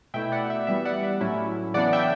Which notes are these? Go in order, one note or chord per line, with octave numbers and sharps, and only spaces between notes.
B2 A3 E4 E5 G5
D5 F#5
E5
E3 G3 B3 E5
D5 F#5
E5
A2 F#3 C#4 E4
C#3 E3 B3 D4 D5 F#5
E5 G5